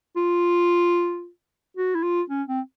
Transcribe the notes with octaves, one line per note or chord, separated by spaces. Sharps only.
F4
F#4
E4
F4
C#4
C4